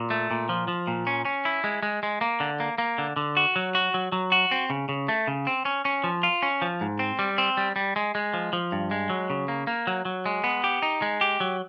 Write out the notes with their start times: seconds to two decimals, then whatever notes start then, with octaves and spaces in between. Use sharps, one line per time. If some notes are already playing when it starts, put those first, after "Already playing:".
Already playing: A#2
0.10 A3
0.31 A#2
0.49 F3
0.68 F3
0.88 A#2
1.07 C#4
1.25 C#4
1.45 E4
1.64 G#3
1.83 G#3
2.03 G#3
2.21 A#3
2.40 D3
2.60 A#3
2.78 A#3
2.98 D3
3.16 D3
3.37 F#4
3.56 F#3
3.75 F#4
3.94 F#3
4.12 F#3
4.32 F#4
4.51 C4
4.70 C#3
4.89 C#3
5.08 A3
5.27 C#3
5.47 C4
5.65 C#4
5.85 C#4
6.04 F3
6.23 F4
6.43 C#4
6.62 F3
6.81 G#2
6.99 C4
7.19 G3
7.38 C4
7.57 G3
7.76 G3
7.96 G#3
8.15 G#3
8.34 F3
8.53 F3
8.72 G2
8.91 G#3
9.10 F#3
9.30 C#3
9.48 A#3
9.67 A#3
9.87 F#3
10.05 F#3
10.26 G#3
10.44 B3
10.64 G4
10.82 D#4
11.02 G#3
11.21 G4
11.40 F#3